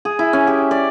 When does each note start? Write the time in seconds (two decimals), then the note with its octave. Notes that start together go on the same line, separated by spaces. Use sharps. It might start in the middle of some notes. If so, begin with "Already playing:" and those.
0.05 G#4
0.19 E4
0.33 C#4
0.47 G4
0.71 D5